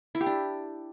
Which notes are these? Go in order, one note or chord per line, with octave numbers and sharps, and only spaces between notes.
E4
G4
D4